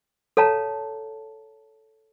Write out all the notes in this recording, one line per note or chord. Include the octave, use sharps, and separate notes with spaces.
A4 C#5 F5 A5 A#5